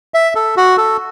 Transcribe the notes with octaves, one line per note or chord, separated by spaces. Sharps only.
E5
A4
F#4
A4